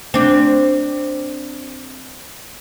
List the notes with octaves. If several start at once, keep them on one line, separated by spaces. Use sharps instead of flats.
C4 D4